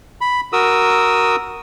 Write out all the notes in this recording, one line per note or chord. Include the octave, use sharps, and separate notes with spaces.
B5
F#4 A#4 D#6 E6